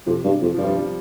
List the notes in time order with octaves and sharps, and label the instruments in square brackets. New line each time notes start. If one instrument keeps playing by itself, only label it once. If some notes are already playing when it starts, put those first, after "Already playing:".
[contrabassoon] F2 [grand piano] C3
[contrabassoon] G2
F2
[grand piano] F3
[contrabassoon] G2 [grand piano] G3
[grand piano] F3